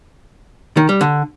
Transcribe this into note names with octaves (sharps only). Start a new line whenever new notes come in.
D#3
G3
D3